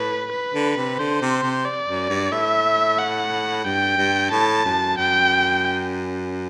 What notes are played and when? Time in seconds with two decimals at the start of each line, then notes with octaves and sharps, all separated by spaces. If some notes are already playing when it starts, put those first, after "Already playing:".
Already playing: A2 B4
0.32 B4
0.55 D3
0.77 C3
0.99 D3 C5
1.21 C3
1.43 C3
1.65 D5
1.88 F#2
2.09 G2
2.31 A2 E5
2.98 F#5
3.65 G2 G5
3.98 G2
4.31 A2 A5
4.65 F#2
4.97 F#2 G5